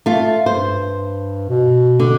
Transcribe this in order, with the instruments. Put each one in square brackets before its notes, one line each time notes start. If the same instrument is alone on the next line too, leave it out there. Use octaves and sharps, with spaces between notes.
[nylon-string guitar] A3 F4
[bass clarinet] G2 [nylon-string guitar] C5
[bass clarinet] B2
[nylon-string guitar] D3